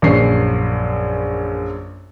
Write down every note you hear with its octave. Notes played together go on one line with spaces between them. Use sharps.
A#1 F#2 C7